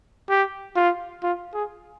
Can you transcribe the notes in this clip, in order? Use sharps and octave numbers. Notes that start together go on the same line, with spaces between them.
G4
F4
F4
G#4